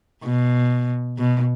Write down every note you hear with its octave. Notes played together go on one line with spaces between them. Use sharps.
B2
B2